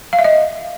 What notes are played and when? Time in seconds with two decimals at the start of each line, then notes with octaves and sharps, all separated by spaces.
0.13 F5
0.19 E5
0.24 D#5